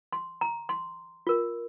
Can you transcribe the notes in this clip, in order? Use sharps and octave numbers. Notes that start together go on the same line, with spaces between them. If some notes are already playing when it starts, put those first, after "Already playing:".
C6
A#5
C6
F4 A#4